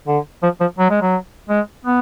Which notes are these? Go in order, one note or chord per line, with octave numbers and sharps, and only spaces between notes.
D3
F3
F3
F#3
G#3
F#3
G#3
B3